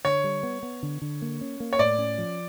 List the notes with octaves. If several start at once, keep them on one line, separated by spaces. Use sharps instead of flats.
D3 C#5
G3
B3
B3
D3
D3
A#3
C#4
A#3
C#5
A2 D5
C#4
F3